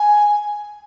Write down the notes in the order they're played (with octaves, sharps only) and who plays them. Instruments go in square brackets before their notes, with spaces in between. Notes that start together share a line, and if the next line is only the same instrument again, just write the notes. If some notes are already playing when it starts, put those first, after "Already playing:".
Already playing: [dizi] G#5